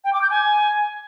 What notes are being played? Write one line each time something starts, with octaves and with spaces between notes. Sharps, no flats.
G5
D6
G6
G#5